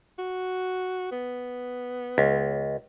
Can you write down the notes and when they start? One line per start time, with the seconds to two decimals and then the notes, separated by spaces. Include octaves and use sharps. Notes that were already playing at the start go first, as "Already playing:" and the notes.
0.19 F#4
1.11 B3
2.18 C#2